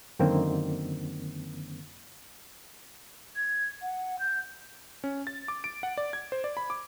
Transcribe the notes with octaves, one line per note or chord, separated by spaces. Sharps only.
F#2 D3 D#3 A#3 C4
G#6
F#5
G6
C#4
A6
D6
D7
F#5
D5
G#6
C5
D5
B5
D6